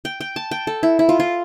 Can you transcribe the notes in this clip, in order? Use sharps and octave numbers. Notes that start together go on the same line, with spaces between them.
G5
G5
A5
G5
A4
E4
E4
F4
F4